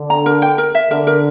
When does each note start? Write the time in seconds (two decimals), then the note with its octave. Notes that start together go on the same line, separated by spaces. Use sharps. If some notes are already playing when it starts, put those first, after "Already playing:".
Already playing: D3
0.10 A#5
0.26 A#4
0.42 G5
0.58 A#4
0.75 E5
0.91 D3 A#4
1.07 A#4